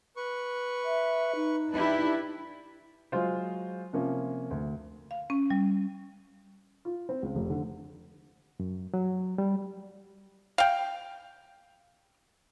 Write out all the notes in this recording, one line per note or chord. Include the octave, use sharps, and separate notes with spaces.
B4 C#6
E5
D#4
D4 E4 G4 B4
F#3 G#3 F4 C5
C3 F3 A#3 C#4
D2
F5
C#4
G3
F4
C4
C#2
F1
D3
F#2
F#3
G3
F5 G5